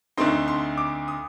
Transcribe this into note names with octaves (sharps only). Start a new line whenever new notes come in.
D2 D3 A3 C4 D#4 C6
C6
D6
D#6